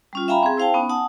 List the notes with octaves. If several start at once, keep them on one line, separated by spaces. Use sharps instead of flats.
G3 C#4 F4
E5 F5 G5 G#5 A#5 B5
C4 G#4
E4 C5 F5 G5 A5
B3 C#4 D#4
F#5 G#5 A5 D#6